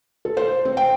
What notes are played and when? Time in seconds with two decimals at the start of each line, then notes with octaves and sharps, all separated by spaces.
0.25 A4
0.37 C5
0.65 C4
0.77 G5